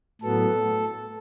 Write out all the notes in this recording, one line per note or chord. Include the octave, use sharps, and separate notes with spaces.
A2 F#3 B3 A4